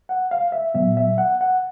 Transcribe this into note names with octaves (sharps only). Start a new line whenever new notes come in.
F#5
F5
E5
A#2 F#3 B3 E5
E5
F#5
F#5